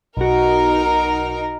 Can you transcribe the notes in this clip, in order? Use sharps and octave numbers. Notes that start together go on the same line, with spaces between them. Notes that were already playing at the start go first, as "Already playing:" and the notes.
B1 D#4 F#4 A#4